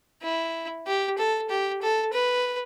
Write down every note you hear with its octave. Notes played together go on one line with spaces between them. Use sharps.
E4
G4
A4
G4
A4
B4